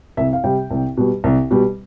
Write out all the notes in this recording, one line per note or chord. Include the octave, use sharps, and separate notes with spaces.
C2 E5
F5
C3 G3 G5
C2
B2 G3
C2
B2 G3